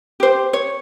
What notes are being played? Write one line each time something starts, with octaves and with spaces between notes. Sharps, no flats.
G4 C5
C#5